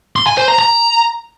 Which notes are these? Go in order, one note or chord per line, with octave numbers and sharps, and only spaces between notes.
C6
G#5
C5
A#5
A#5